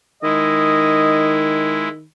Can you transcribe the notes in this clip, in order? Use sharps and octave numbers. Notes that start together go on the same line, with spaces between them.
D#3 G#3 E4 D#5